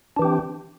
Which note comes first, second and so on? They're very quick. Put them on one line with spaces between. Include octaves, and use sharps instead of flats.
D4 E3 G4 C4